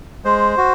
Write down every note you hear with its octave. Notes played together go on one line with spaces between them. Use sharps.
G#3 C5
F#4